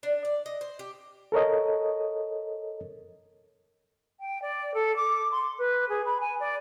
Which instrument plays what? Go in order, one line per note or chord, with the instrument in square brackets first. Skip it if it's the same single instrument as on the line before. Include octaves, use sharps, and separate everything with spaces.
[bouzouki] D4
D5
D#5
C5
G4
[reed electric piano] A4 A#4 C#5 D#5
[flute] G5
D5
A4
D6
C6
B4
G#4
B5
G#5
D5